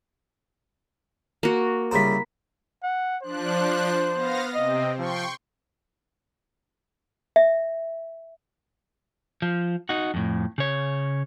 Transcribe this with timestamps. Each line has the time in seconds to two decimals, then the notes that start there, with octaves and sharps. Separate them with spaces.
1.43 A#3 F#4
1.91 C2 C#3 C5 A#5 B5 B6
2.83 F#5
3.23 F3 D4 C5 F#6
4.14 B3 F5 A#6
4.54 C3 C4 D#5
4.99 F3 G5 C6 C#6
7.36 E5
9.42 F3
9.89 D#4 F#4
10.14 F2 A2
10.58 C#3 C#5